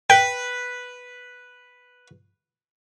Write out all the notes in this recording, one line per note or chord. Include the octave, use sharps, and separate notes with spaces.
B4 G5